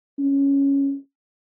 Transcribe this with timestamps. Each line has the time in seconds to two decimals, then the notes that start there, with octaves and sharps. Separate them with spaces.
0.19 C#4